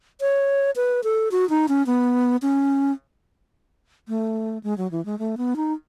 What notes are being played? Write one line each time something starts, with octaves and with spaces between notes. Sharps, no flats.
C#5
B4
A4
F#4
D#4
C#4
B3
C#4
A3
G#3
F#3
E3
G#3
A3
B3
D#4